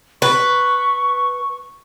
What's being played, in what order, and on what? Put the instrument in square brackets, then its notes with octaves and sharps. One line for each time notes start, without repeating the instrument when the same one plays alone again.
[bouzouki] B4 [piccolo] C#6